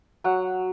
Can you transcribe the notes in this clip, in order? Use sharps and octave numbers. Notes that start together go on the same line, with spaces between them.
F#3 F#5